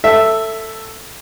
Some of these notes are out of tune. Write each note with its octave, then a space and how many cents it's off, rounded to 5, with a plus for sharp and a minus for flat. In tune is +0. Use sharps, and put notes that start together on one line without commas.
A4 +15 E5 +0